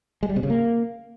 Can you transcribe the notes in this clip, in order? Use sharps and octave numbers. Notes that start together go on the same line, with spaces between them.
G#3
G3
C3
C#3
A#3